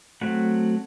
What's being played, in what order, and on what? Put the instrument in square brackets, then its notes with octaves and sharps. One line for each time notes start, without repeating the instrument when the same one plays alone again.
[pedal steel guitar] F#3 A3 C4 F#5